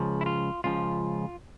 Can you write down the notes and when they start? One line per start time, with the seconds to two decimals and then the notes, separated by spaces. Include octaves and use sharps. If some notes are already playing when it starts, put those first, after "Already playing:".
Already playing: C#2 C#3 F3
0.21 E4
0.26 F4
0.64 C#2 C#3 F3 F4